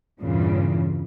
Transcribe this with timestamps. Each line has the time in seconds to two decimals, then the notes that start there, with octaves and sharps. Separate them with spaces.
0.20 E2 G2 A#2 C#3 E3